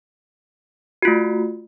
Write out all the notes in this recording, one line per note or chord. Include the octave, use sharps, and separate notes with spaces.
A3 F4 F#4